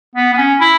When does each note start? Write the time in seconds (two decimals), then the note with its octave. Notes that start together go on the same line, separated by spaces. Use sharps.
0.15 B3
0.33 B3
0.37 C#4
0.60 E4